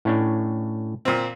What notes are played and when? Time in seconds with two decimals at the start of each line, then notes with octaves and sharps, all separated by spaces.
0.05 A2 C#4 D4
1.05 A#2 C4